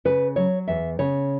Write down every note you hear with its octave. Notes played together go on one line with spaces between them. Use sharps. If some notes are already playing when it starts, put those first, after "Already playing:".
C#3 B4
F#3 C#5
E2 E5
C#3 C#5